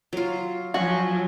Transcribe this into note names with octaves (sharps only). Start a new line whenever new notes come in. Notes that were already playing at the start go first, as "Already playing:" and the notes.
F#3 F4
F3 F#3 F#4 G#5